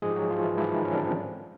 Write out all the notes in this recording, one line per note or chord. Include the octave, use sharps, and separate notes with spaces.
G#2 F3 G#3 G#4
G4
F#3 F#4
F3 F4
E3 E4
G#2 E3 F3 E4
D#3 D#4
C#4
D3 D4
C4